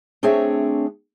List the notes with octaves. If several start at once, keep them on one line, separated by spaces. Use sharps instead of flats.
A3 C4 D4 G#4 C#5 E5